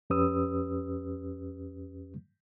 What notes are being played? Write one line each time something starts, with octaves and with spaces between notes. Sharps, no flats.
F2 C#4 G4 B4 D#6 E6